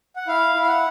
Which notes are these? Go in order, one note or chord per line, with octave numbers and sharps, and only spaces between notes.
F#5
E4 F5
E4
F5
F#5